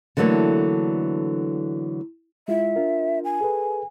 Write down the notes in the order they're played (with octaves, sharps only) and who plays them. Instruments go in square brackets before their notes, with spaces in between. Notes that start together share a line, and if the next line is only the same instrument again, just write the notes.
[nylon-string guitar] D3 E3 F#3 A3 A#3 D4
[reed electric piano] G#3 E4 F4 [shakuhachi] E5
[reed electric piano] D4 F4 A#4
[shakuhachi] G#5
[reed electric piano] G#4 A4 B4